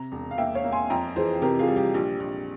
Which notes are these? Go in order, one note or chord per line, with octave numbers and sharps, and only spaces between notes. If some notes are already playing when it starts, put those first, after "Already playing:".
Already playing: C3 A#5
E1
F5
A#3 E5 G5
C#5 F5
A#3
G#5 C6
F2 G5 A#5
E3 G#4 C5
C3 G4 A#4
F4 G#4
G3
G4
A#1 G4
A#1